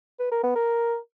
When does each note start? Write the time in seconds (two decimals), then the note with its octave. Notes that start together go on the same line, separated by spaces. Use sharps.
0.19 B4
0.31 A#4
0.43 B3
0.55 A#4